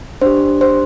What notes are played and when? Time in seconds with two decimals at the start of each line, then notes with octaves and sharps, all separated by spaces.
0.22 D4 G4 C5
0.61 C5